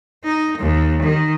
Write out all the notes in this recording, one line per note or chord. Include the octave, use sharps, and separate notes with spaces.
D#4
D#2
D#3